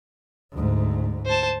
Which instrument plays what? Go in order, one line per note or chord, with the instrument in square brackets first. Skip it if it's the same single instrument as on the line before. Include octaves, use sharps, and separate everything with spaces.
[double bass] D2 G#2
[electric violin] C5 A5